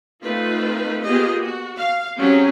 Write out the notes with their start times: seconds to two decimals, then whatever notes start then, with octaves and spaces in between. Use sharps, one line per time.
0.23 A3 C4 D#4 F4 B4
1.04 A#3 B3 F4 G4 G#4 D#5
1.44 F#4
1.78 F5
2.17 F#3 C4 C#4 G4 G#4